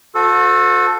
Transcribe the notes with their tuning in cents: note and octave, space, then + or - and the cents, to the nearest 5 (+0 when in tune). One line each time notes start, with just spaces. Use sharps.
F#4 -40 A4 +0 C5 -35